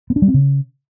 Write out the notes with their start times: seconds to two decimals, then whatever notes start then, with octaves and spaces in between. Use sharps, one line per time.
0.10 B3
0.16 D4
0.22 G3
0.28 C4
0.34 C#3